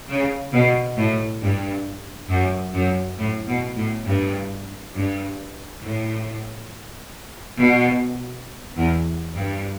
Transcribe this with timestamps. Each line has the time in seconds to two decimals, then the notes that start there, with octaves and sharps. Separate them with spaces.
0.09 C#3
0.53 B2
0.97 A2
1.41 G2
2.29 F#2
2.73 F#2
3.18 A2
3.47 B2
3.76 A2
4.06 G2
4.93 G2
5.83 A2
7.59 B2
8.76 E2
9.35 G2